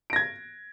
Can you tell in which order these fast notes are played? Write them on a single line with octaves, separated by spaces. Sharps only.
D7 A#6 G#6